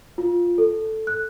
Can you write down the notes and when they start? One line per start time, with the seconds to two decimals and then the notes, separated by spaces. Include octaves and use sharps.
0.18 F4
0.58 A4
1.07 F#6